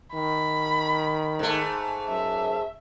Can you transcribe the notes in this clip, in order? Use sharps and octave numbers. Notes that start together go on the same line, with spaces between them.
D#3 B5
G#2 A3
F#2 E5